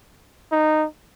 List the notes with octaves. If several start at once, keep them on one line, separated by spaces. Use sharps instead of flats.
D#4